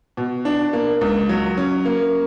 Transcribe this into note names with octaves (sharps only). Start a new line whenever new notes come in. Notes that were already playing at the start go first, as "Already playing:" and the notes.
B2
D4
A#3
C#2
F#3
C#4
A#3